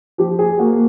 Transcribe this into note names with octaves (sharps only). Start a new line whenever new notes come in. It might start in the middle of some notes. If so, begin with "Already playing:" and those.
F3 G4
G#4
A#3 F#4